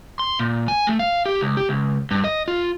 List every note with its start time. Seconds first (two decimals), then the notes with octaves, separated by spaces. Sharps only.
0.19 C6
0.39 A#2
0.68 G#5
0.87 A3
0.99 F5
1.26 G4
1.41 C#2
1.57 G4
1.69 C#2
2.11 G2
2.24 D#5
2.48 F4